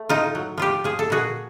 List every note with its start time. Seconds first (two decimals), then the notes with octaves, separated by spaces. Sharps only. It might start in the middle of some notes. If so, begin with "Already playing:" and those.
Already playing: A3
0.09 A2 D#4 F4
0.35 F#3
0.58 F3 F4 G4
0.84 F3 G#4
0.99 A4
1.10 A#2 F#4 G#4